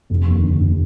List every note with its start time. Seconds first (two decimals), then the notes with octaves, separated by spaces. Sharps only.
0.10 F1
0.27 D#2
0.43 D3
0.60 F1